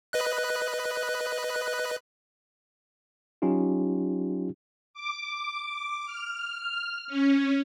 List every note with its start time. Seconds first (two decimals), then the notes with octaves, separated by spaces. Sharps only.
0.13 B4 D#5 F#6
3.42 F#3 C#4 D#4 F4 G4
4.94 D6
6.05 F6
7.07 C#4